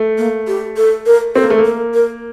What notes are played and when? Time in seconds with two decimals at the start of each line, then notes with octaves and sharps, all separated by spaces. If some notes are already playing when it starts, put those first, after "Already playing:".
Already playing: A3
0.18 A#3
0.47 G4
0.76 A4
1.06 A#4
1.35 C4 A4
1.43 A#3
1.50 A3
1.58 A#3
1.65 A#4
1.94 A#4